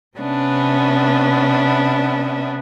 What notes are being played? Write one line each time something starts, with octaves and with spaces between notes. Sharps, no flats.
C3 B3 C#4 D4 E5